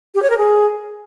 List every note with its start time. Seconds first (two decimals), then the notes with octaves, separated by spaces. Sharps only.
0.15 G4
0.22 C#5
0.30 A#4
0.38 G#4